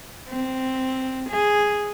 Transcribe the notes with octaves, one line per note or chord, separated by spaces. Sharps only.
C4
G#4